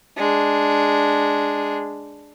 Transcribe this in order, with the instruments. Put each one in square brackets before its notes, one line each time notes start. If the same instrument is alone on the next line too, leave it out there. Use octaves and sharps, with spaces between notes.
[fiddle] G#3 D4